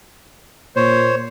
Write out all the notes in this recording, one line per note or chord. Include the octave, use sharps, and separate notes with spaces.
A#2 C5 C#5